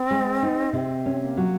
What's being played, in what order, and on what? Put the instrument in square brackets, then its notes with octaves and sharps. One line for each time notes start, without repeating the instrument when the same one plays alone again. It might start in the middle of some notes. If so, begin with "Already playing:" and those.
Already playing: [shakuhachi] C4
[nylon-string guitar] G#3
D#4
[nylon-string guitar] C3 [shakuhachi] C4
[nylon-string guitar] C#4
[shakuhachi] A#3
[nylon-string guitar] F#3